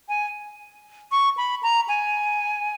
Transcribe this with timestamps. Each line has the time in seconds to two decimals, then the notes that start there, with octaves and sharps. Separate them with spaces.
0.09 G#5
1.12 C#6
1.37 B5
1.63 A#5
1.88 G#5